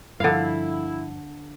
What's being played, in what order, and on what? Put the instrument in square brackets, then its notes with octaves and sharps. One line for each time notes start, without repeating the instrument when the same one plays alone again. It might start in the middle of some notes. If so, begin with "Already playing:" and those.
[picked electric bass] G2 F3 [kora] D3 F5 [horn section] E4